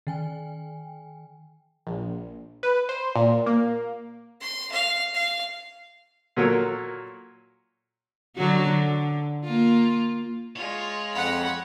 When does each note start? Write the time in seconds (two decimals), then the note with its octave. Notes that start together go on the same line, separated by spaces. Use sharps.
0.07 D#3 G5 G#5
1.87 A#1
2.63 B4
2.89 C5
3.16 A#2
3.46 A#3
4.41 C6
4.72 F5
5.14 F5
6.37 A#2 F#3 A4 A#4 C#5
8.36 D3 F#3 F#4
8.69 D3
9.45 A#3 F4
10.56 G#3 F4 C#5
11.14 F2 F#5 B5